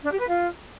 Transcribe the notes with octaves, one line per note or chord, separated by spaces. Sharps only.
D4
G4
B4
F4